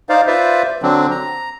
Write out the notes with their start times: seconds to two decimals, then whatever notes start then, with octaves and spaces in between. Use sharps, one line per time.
0.09 D#4 C5 D5 F5
0.27 F4 B4 C5 D5 E5
0.82 D3 F#3 C4 D4
1.11 A#5